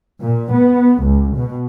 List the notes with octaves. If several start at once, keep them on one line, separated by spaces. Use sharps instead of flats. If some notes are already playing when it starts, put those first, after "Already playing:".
A#2
B3
C#2
B2